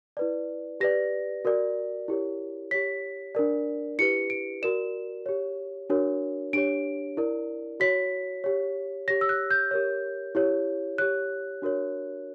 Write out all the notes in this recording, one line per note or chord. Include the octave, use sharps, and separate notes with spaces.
E4 B4 D5
G4 B4 D5 A#6
F#4 A#4 D5
E4 G4 A#4 C#5
G4 C#5 B6
D4 A#4 D5
E4 G4 B4 C#7
D7
F#4 A#4 D5 E7
G4 C#5
D4 F#4 A#4 C#5
D4 G4 C#5 D7
E4 A#4 D5
F#4 C#5 B6
G4 C#5
G4 C#5 A#6
E6
F#6
G6
G4 A#4 C#5
E4 G4 C#5
G4 C#5 F#6
D4 F#4 A#4 C#5